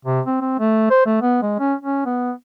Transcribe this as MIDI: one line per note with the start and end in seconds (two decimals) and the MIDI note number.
0.05 0.20 48
0.26 0.38 60
0.41 0.56 60
0.59 0.88 57
0.90 1.02 72
1.06 1.21 57
1.22 1.41 59
1.42 1.56 56
1.59 1.74 61
1.81 2.04 61
2.06 2.32 59